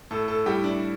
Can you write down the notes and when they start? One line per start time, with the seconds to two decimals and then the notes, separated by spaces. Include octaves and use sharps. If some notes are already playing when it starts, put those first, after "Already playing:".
0.11 A2 A4
0.28 A4
0.46 G3 E4 G4
0.64 D4